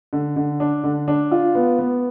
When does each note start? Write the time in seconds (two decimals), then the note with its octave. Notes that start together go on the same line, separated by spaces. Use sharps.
0.13 D3
0.36 D3
0.60 D4
0.84 D3
1.08 D4
1.31 F4
1.55 B3
1.79 B3